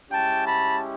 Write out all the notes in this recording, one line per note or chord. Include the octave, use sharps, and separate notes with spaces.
G#3 C#4 E4 G4 G5 A5
A5 B5